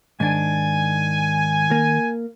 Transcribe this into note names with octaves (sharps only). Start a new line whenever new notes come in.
G#2 D#3 D4 G#5
A#3